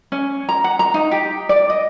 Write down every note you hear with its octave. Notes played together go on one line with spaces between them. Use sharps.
C#4
A#5
F#5
A#5
D#4
G4
D5
D#5